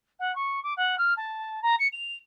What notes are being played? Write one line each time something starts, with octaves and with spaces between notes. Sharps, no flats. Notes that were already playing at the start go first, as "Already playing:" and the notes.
F#5
C#6
D6
F#5
F6
A5
A#5
C#7
F7